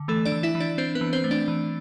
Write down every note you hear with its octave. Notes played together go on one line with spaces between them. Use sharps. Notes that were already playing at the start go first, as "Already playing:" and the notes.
Already playing: D3
E3 A3 A4
D4 D5
E3
E4 E5
E3
D4 D5
C4 D4 C5
B3 B4
E3
C4 C5
A3
D4 D5
E3